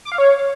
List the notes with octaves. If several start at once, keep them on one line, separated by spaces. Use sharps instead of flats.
D6
F5
C#5